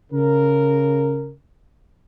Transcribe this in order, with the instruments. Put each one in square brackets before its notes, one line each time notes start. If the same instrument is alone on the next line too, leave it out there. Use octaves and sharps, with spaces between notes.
[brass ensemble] C#3 A#4